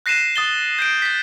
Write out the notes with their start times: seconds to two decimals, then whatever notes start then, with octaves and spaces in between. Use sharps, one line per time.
0.06 F#6 A#6 C7 D#7 E7
0.36 D#6 A6 G7
0.79 G6 C7 D7
1.02 A6 B6